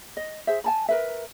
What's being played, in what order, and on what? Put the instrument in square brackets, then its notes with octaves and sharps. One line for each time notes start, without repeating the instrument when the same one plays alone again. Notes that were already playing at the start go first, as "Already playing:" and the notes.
[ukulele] D#5
G#4 C5 E5
G#5 A5 B5
A#4 B4 E5